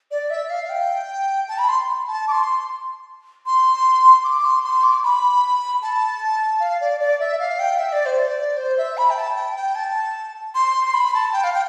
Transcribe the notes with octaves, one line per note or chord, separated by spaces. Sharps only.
D5
E5
F5
G5
A5
B5
C6
A5
D6
C6
C6
D6
C6
C6
D6
B5
A5
F5
D5
D5
E5
F5
G5
E5
D5
C5
D5
C5
E5
B5
G5
A5
G5
G5
A5
C6
B5
A5
G5
F5
G5